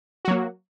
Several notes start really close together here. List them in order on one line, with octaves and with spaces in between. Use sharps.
F#4 F#3 A#3